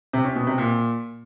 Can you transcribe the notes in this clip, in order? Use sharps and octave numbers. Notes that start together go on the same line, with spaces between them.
C3
C#4
B2
C3
A#2